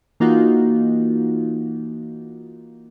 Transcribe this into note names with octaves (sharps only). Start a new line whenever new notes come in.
E3 A#3 D#4 F4 F#4